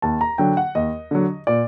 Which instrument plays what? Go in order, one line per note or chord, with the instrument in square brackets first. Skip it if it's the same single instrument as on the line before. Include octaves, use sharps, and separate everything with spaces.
[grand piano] D#2 A5
A#5
D3 F#3 G5
F#5
D#2 D#5
D3 F#3
A#2 D5